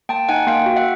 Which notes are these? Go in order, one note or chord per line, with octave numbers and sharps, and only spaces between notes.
A#3 G5 A5
D#4 F#5 G#5
A#3 F5 G5
F#4
E5 F#5